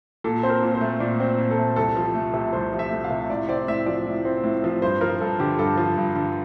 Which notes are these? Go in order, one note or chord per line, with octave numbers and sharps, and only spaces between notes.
A#2 A4
C4 C5
A#4
A#2
C5
A3
A#2 D5
C4
A#2
A4
A3
C2 A4
F3
A3
C3
C2 C5
F3
E5
A3
F5
C3
A2 D5
C4 D5
A2 E5
F3 D5
A2
C4
A2
F3
G2 C5
F3 A#4
G2 A4
D3 G4
G2 A4
F3
G2
D3